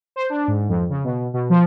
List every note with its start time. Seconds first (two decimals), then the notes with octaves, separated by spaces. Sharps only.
0.16 C5
0.29 D4
0.48 G#2
0.69 F2
0.90 C#3
1.04 B2
1.34 B2
1.50 F3